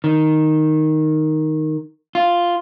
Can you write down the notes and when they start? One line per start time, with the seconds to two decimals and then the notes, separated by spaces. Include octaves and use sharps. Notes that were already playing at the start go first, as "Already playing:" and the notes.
0.04 D#3
2.15 F4